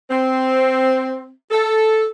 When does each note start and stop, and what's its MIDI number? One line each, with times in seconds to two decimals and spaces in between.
0.09 1.31 60
1.51 2.07 69